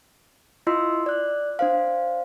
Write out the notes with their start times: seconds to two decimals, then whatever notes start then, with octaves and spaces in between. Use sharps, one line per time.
0.67 E4 F4 D#5 C6 E6
1.06 D5 F#6
1.59 D4 C5 F5